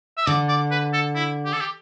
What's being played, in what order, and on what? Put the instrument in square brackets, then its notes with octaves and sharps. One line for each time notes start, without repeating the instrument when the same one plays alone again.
[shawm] E5
[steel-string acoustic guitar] D3 [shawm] D5
[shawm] D5
B4
A4
E4
G4
A4
G4